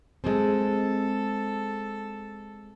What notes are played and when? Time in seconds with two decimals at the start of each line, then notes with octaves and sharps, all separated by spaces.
0.24 G#3 C4 A4